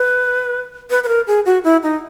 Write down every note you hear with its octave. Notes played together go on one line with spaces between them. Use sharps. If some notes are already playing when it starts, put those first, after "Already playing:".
Already playing: B4
B4
B4
A#4
G#4
F#4
E4
D#4